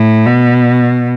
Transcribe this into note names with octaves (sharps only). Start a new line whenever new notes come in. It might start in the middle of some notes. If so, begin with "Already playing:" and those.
Already playing: A2
B2